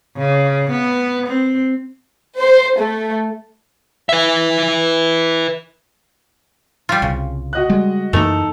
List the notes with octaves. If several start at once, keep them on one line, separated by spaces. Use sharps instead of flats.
C#3
B3
C4
C5
A3
B4 E5
G3 F4
C2 C#3
F#4 D#5 F#6
G3 G#3
F#2 E3 A3 A#3 D#4 A4 F7